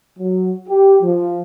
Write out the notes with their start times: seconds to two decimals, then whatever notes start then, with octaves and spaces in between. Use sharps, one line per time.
0.18 F#3
0.68 G4
1.02 F3